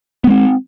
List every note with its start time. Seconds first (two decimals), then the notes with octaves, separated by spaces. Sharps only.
0.24 B3
0.27 G#3
0.30 C4